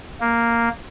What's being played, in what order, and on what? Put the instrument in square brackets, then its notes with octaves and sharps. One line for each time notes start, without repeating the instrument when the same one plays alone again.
[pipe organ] A#3